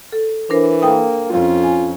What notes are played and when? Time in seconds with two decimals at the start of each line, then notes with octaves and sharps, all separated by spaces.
0.12 A4
0.50 E3 D4 A#4 C5
0.82 A#3 A4 G5 D#6
1.30 F2 C#4 F4
1.63 G#5